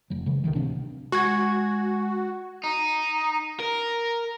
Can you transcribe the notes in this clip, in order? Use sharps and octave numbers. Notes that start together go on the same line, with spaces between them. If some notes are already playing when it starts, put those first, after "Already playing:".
F1 F#3
C#3 E3 G#3
C#2 C3 D#3 E3
D1 C3 C4 D4
G#3 F#4 C#6 G#6
D#4
A#4